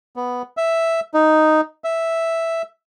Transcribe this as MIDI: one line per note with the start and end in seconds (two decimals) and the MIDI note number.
0.16 0.42 59
0.57 1.00 76
1.14 1.61 63
1.84 2.62 76